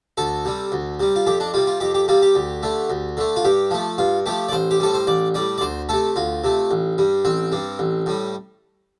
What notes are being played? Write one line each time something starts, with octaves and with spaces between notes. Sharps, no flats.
D2 A4
C3 G3
D2
C3 G3
F4
F2 G4
D4
C3 G3 F4
F4
F2 G4
G4
C3 G3 F4
G4
D2
D3 A3
D2
D3 A3
F4
G2 G4
F3 A3
G2 F4
F3 A3 G4
D5
A1 C5
G4
A2 G3 A4
C5
A1 D5
A2 G3 D5
D5
D2 C5
C3 A3 A4
D2 F4
C3 A3
A1
G2 G3
A1 C4
G2 G3
A1
A2 G3